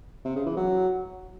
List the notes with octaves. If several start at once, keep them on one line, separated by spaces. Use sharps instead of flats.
C3
C#3
E3
F#3